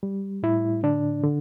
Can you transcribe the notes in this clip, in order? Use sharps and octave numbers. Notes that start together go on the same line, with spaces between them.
G3
A2 E4
D3 D4
D3